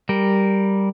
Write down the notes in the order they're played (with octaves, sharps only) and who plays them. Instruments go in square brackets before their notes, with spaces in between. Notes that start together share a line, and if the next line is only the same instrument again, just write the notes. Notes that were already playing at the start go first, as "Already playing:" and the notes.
[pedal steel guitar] G3 A#4